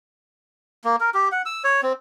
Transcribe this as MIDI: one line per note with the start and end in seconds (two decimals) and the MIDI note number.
0.84 0.96 58
1.01 1.10 70
1.14 1.28 67
1.32 1.42 78
1.46 1.63 88
1.64 1.81 73
1.83 1.93 60